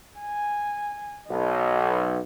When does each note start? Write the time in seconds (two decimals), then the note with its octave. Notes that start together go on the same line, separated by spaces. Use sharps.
0.19 G#5
1.30 B1 D#5